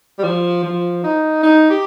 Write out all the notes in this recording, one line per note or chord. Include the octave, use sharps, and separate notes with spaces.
G3
F3
F3
D#4
D#4
G4